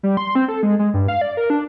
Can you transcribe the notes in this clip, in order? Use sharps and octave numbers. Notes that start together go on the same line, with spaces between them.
G3
C6
C4
A4
G#3
G#3
G2
F5
D5
A#4
D4